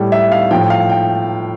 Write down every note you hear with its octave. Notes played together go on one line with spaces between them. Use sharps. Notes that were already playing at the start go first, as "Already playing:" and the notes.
Already playing: A2 G3
E5
F5
A2 F3 G5
F5
G5